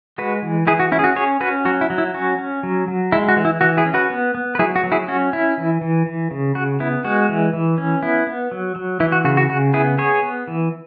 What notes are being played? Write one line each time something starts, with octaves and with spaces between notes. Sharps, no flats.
G#3 F#4 B4
E3
E3 E4 G#4
F#4
C#4 E4
G#4
F#4
C#4 G#4 C#5
C#4 F#4 B4
F#3 F#4
E4
F#3
E4
C#4 F#4
C#4
F#3
F#3
G#3 E4
F#4
E3
E4
E3 F#4
E4 G#4
C#4
F#4 B4
B3
B3
B4
F#3 E4 G#4
F#4
F#3
E4 G#4
C#4 F#4
C#4 E4
E3
E3
E3
C#3
C#3 F#4
B3 E4
G#3 F#4
E3
E3
C#4
B3 E4
B3
F#3
F#3
E3 E4
F#4
C#3 F#4
F#4
C#3 F#4
B3 E4 G#4
B3 G#4 C#5
B3
E3